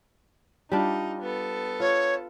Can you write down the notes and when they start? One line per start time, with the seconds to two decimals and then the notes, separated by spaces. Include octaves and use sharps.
0.72 G3 D4 D#4 F4
1.22 B3 A4
1.80 F4 C#5